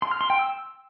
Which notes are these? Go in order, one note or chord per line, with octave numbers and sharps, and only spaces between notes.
C6
F6
C6
G5
E6